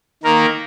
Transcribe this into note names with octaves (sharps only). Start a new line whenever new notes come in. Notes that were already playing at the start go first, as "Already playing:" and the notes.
D#3 A#3 A#4